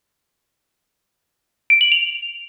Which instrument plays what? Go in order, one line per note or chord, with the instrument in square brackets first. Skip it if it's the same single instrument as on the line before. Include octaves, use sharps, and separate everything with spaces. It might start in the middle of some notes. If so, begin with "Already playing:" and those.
[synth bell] D7
F#7
F7